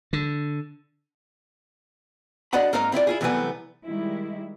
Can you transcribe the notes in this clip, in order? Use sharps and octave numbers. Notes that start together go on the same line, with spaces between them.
D3
D4 F#4 D5 D#5 F#5 B5
G#2 A#3 C4 D#4 A#4 F5
C4 E4 F4 D5
E4 F4 G#4
C2 E3 F#3 A3 B3 G#5
D#3 G3 G#3 E4